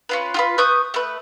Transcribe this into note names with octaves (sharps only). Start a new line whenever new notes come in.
C#4 F4 B4
F4 G4 B4
B4 C#6 D#6 G6
A3 B4